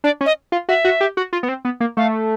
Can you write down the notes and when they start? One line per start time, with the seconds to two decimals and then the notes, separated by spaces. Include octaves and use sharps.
0.04 D4 D5
0.21 C#4
0.26 D#5
0.52 F4
0.69 F#4 E5
0.85 F#4
1.01 G4
1.17 F#4
1.33 F4
1.43 B3
1.49 C4
1.65 B3
1.80 A#3
1.97 A3 F5